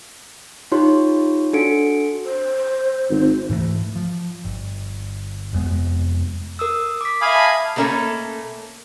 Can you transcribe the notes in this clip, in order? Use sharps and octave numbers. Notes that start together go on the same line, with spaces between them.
D#4 F4 G4 C#5 C6
D4 F#4 A4 C#7 D7
C5
G#1
G#2 E3 F3 A3
F3
G1
F1 F2 G#3 B3
A#4 D#6 E6
D6 B6
E5 F5 G#5 B5 D#6
E5 A5
B2 A3 A#3 C#4 A4